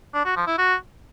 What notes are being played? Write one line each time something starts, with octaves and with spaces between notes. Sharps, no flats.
D4
F#4
F3
E4
F#4